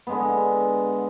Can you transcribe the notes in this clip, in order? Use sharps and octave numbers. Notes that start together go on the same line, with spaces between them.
D3 G#3 B3